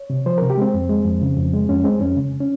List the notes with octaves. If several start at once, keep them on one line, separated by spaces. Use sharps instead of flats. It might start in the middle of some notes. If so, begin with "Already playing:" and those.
Already playing: C#5
C3
F3 C5
C3 A#4
G4
G#3 C4
F2
G#3
F2
C#3
F2
G#3
F2 C#4
G#3 C4
F2 C#4
C#3
C#4